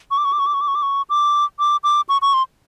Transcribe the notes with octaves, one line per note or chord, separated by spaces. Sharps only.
C#6
D6
C#6
D6
C#6
D6
C#6
D6
C#6
D6
C#6
D6
D6
D6
C#6
C#6
C6